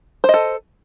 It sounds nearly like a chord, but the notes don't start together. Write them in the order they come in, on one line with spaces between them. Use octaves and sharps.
C5 D#5 A4